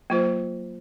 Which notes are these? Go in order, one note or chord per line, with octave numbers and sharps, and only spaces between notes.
F#3 A#3 F4 C5